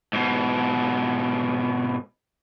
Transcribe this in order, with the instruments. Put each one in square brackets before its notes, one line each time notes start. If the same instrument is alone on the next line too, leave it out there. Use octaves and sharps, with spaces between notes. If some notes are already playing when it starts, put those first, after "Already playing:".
[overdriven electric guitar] G#2 B2